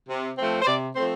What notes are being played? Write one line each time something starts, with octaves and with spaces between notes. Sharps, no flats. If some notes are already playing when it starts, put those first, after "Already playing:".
C3
F3 A3 C4
C5
C3 D5
F3 A3 C4 C5